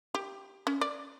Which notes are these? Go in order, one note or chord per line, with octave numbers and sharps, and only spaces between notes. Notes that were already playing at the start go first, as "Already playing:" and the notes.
G4
C#4
D5